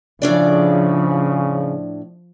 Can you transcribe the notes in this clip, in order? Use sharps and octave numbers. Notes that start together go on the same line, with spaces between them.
A2 C#3 F3 D4 D5